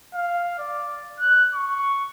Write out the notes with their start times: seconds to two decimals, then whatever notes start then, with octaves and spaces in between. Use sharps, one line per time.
0.14 F5
0.59 D5
1.20 F#6
1.54 C#6